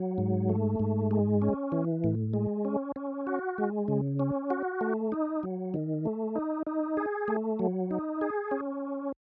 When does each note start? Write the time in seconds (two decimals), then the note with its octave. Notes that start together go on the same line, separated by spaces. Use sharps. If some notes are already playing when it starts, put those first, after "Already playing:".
Already playing: F#3
0.18 G#2
0.49 A3
0.79 G#2
1.11 G#3
1.42 C#4
1.72 E3
2.04 A2
2.34 G#3
2.65 C#4
2.96 C#4
3.27 F#4
3.58 G#3
3.88 C#3
4.19 C#4
4.50 F#4
4.81 A3
5.12 D#4
5.43 F#3
5.74 D#3
6.05 A3
6.36 D#4
6.67 D#4
6.97 G#4
7.28 A3
7.59 F#3
7.91 D#4
8.21 G#4
8.51 C#4